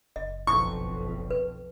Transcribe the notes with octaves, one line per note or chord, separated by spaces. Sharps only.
F#1 D#5
B1 F2 E4 C#6
B4